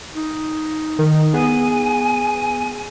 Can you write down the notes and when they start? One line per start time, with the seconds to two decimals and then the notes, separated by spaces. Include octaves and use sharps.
0.15 D#4
0.99 D#3
1.33 B3 G#4 G#5